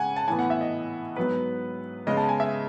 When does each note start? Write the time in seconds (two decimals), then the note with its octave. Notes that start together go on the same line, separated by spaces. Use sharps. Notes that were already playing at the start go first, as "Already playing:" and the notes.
Already playing: C#3 G#3 C#4 F#5 G#5
0.16 A5
0.28 A2 E3 B3 G#5
0.39 F#5
0.50 E5
0.61 D#5
1.16 G#2 F#3 B3 B4
2.07 C#3 G#3 B3 D#5
2.17 A5
2.29 G#5
2.40 E5